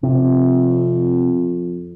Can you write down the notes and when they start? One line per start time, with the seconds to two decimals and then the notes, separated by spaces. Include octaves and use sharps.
0.03 F2 C3